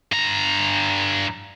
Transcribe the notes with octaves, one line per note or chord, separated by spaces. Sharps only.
G2 A#5